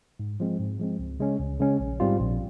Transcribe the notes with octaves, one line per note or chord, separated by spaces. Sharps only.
G#2
F3 G#3 C4
G#2
F3 G#3 C4
C#2
C#3 G#3 C#4
C#2
C#3 G#3 C#4
A#1
G#2 G3 C4 F4
A#1